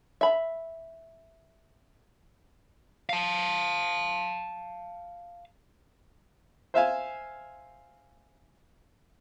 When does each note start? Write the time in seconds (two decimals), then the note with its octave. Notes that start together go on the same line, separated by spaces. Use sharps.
0.21 E5 B5
3.09 F5 A5
6.74 C5 E5 F5 G#5